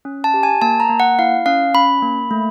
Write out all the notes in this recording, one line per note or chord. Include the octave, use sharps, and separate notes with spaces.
C#4
A5
G4
G#5
A#3 A5
A#5
A#3
F#5
E4 F5
C#4 F5
C#4 B5
A#3
A3